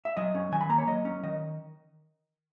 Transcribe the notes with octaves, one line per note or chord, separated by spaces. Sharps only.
E5
F#3 D#5
C#4
D#3 G#5
B5
A#3 A#5
C#5
F#3 D#5
C#4
D#3 D#5